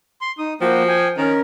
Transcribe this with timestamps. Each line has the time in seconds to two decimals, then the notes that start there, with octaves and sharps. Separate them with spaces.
0.21 C6
0.39 D#4 D#6
0.61 F3 A#3 F#4 G5
0.88 G5 G#5
1.18 D#3 C#4 A#4